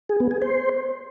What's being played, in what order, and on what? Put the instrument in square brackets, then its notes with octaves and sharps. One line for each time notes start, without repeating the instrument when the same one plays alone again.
[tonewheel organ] G#4
B3
G#4
C5